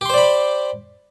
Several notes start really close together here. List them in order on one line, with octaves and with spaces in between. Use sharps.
G4 C6 C5 D5 B5